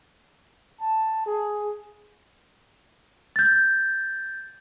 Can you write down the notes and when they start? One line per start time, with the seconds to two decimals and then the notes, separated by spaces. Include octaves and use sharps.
0.81 A5
1.26 G#4
3.36 G6 A6